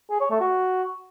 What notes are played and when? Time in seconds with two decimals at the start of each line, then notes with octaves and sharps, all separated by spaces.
0.10 G#4
0.20 C#5
0.30 A3
0.40 F#4